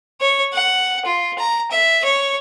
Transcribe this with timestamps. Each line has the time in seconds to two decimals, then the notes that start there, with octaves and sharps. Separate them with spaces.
0.21 C#5
0.53 F#5
1.05 F4
1.39 A#5
1.71 E5
2.04 C#5